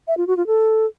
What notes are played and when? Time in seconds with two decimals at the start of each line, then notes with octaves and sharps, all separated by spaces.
0.08 E5
0.17 F4
0.27 F#4
0.37 F4
0.47 A4